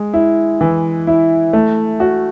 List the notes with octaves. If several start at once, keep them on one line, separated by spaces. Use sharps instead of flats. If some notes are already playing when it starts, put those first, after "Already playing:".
Already playing: G#3
E4
E3
E4
A3
F#4